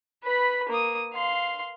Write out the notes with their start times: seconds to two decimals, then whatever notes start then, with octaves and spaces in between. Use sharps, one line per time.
0.24 B4 B5
0.69 A#3 D#6
1.13 F5 C6